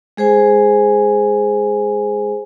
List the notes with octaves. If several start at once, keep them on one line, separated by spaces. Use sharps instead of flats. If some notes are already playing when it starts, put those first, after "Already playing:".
G#3 G#4 C5 G#5